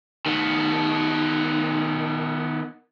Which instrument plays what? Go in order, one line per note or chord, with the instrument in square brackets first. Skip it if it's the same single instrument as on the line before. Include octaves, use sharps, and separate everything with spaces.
[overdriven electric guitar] D#3 B3